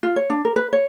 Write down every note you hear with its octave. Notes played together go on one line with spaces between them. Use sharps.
F4
C#5
D4
A#4
B4
C#5